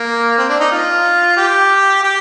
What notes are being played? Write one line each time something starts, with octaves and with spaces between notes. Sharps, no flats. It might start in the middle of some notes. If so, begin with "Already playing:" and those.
Already playing: A#3
C4
D4
D#4
F4
G4
G4